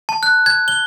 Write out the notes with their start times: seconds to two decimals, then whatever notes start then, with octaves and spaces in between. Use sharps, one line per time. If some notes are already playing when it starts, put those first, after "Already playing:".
0.09 A5
0.23 F#6
0.46 G#6
0.68 G7